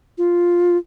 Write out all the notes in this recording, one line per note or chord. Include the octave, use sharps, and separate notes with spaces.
F4